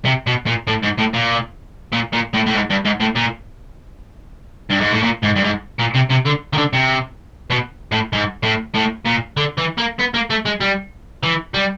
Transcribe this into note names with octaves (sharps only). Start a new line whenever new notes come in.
C3
B2
A#2
A2
G#2
A2
A#2
A#2
A#2
A2
A2
G#2
G2
G#2
A2
A#2
G2
G#2
A2
A#2
G#2
G2
G#2
A#2
C3
C3
D3
D#3
D3
C3
B2
A2
G#2
A2
A2
A#2
D3
E3
A#3
B3
A#3
A3
G#3
G3
E3
G3